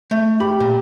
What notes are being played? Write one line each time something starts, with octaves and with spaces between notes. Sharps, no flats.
A3
G4 B5
A#2